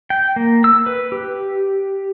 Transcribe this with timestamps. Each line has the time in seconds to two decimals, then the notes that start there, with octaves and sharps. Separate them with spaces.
0.10 G5
0.36 A#3
0.64 E6
0.86 B4
1.12 G4